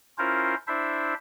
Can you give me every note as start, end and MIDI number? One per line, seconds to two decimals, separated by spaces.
0.18 0.55 61
0.18 0.55 64
0.18 0.55 65
0.18 0.55 70
0.18 0.55 72
0.67 1.14 62
0.67 1.14 64
0.67 1.14 72
0.67 1.14 76